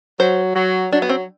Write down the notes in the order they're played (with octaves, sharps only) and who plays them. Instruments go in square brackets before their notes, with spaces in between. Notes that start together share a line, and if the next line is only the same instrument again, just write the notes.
[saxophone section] F#3 [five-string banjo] C5
[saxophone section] F#3
[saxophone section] F#3 [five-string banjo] D4
[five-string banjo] B3
C4